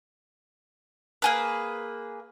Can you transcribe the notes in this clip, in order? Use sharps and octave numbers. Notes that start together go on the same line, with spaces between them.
A#3 G#4 B4